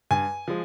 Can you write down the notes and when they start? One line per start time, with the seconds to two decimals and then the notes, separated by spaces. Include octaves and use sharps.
0.11 G2 G#5
0.48 F3 G#3